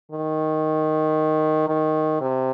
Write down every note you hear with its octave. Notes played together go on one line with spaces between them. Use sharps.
D#3
D#3
C3